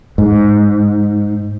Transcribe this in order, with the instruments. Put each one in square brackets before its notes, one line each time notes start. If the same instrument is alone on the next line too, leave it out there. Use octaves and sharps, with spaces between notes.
[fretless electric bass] G#2